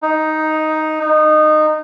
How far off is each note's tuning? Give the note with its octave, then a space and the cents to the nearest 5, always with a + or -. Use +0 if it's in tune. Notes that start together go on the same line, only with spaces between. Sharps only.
D#4 +5
D#4 -20